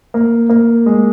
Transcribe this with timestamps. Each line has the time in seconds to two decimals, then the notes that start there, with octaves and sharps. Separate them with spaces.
0.14 A#3
0.50 A#3
0.86 G#3